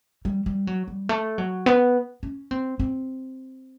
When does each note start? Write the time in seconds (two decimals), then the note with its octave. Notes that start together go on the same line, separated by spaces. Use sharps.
0.25 G3
0.46 G3
0.67 F#3
0.88 G3
1.09 A3
1.38 F#3
1.66 B3
2.23 C#4
2.51 C4
2.79 C4